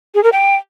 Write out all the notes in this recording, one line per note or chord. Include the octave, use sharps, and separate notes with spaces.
G#4
A#4
G5